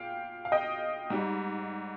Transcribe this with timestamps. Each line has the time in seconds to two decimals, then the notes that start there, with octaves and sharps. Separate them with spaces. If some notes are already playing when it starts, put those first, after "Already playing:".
Already playing: A#2 F5 G5
0.45 F5
0.52 D#5 G5
1.10 G#2 G3